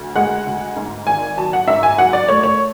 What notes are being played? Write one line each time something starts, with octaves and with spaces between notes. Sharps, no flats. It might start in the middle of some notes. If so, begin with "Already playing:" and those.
Already playing: D2
G#3 F#5
D2
G#2
G#1 G#5
F#3 A5
F#5
G#2 E5
G#5
F#3 F#5
D5
A3 C#5
C#5